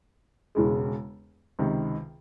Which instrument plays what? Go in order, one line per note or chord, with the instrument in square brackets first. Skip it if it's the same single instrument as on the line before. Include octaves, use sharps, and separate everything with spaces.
[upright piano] E1 E2 C#3 G#3
C#2 C3 D#3